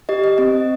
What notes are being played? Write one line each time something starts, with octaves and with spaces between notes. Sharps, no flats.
G4 D#5
D#5
C4 D#5